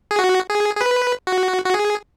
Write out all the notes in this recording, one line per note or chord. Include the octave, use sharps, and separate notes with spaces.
G#4
F#4
G#4
G#4
B4
F#4
F#4
G#4